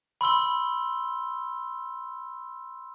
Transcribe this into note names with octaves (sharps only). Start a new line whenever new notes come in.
B5 C6 E6 G7